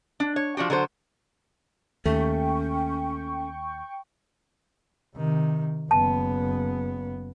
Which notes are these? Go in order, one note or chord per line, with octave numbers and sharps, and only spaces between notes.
D4
C#5
F3 D4 F#4 G4
D3 F#3 A4 C5
D#2 A3 C#4 G5 C#6
C3 D#3
F#1 B3 A5